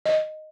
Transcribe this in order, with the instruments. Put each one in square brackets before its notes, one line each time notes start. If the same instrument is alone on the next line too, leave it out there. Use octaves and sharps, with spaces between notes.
[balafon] D#5